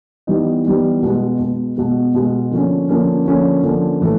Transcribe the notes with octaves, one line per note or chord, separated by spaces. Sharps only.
E3 G3 B3 D#4
E3 G3 B3 D#4
B2 G#3 B3
B2 G#3 B3
B2 G#3 B3
B2 G#3 B3
D3 F3 A#3 C#4
D3 F3 A#3 C#4
D3 F3 A#3 C#4
D3 F3 A#3 C#4
A2 E3 A3